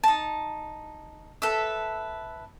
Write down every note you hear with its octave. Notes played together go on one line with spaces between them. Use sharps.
D#4 A5
A4 B4 E5